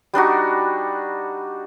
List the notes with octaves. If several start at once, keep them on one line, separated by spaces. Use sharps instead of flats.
G3 D4 D#4 F#4